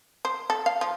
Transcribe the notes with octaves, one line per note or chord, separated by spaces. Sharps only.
C5
A4
F5
F3